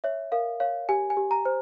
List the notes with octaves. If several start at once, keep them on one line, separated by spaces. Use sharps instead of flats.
C#5 E5
A#4 F5
C#5 F5
G4 G#5
G#5
G4
A#5
C5